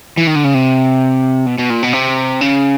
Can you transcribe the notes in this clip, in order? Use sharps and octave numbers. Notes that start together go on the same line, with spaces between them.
E3
D#3
D3
C#3
C3
B2
B2
A#2
B2
C3
C#3